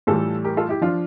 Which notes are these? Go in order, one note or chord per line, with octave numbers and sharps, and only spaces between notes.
A2 E3 G3 F4 A4
G4 A#4
F4 A4
E4 G4
F3 D4 F4